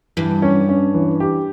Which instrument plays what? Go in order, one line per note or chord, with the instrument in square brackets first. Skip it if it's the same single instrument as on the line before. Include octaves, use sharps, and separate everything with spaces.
[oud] G2 [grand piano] E3
[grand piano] C#4
C#4
E3
G4